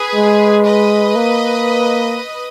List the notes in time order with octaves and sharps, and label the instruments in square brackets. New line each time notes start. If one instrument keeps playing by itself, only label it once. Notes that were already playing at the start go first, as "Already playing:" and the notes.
Already playing: [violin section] G#4 B4
[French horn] G#3
[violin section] B4 D#5
[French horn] A#3